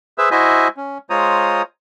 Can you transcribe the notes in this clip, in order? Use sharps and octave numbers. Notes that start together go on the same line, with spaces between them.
G#4 B4 C5 E5 E6
E4 F#4 C5 D#5 E5 G#5
C#4
G#3 F4 C5 C#5 A#5 D#6